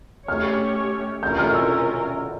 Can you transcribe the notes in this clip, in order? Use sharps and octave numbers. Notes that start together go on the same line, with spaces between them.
A3 C#4 G4 C#5 F6
C#4 F4 A#4 G6
F6
E6